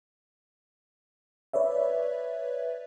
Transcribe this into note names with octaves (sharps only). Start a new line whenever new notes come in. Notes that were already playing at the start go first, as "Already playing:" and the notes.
B4 C#5 D5 E5